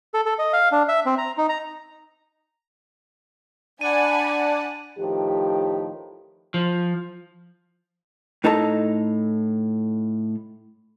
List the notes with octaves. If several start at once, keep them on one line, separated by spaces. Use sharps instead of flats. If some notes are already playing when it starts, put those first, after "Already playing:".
A4
A4
D#5
F5
D4
E5
C4
A#5
D#4
A#5
D4 D5 F#5 G#5 A5 B5 D#7
A2 D#3 F3 G4
F3
A2 D#4 A4 A5 A#5